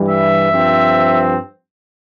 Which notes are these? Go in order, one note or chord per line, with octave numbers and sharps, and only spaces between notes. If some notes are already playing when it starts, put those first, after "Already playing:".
Already playing: G2 E3 G3
E5
G2 F3 C4